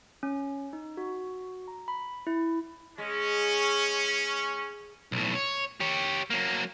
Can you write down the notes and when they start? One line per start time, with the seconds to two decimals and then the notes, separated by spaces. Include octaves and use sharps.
0.23 C#4
0.73 D#4
0.97 F#4
1.68 A#5
1.88 B5
2.27 E4
2.98 G#3 C#4
5.12 B1 A2
5.35 C#5
5.80 G4 C#5
6.30 F#3 A#3